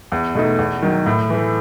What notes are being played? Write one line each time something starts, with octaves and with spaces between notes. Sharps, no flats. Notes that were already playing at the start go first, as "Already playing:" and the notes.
E2
B2 A3 D#4
E2
D#3 F#3
A2
E3 A3